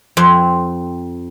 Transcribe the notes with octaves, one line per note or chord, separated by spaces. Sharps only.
F2 C4